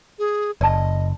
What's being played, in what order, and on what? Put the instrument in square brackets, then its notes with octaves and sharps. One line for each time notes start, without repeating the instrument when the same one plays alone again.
[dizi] G#4
[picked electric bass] F#1 [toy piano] D5 A5 [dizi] D#5